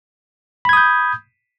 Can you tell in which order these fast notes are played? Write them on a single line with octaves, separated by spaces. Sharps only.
B5 G#6 D#6 G6